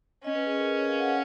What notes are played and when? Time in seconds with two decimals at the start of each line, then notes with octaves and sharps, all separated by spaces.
0.24 C#4 D#5
0.35 B4
0.46 G#4
0.57 A#4
0.68 B4
0.78 C#5
0.88 F5
0.99 F#5